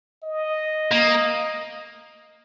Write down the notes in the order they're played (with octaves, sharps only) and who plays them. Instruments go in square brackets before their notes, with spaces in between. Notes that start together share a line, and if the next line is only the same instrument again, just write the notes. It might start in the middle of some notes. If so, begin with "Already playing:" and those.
[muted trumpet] D#5
[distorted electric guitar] A#3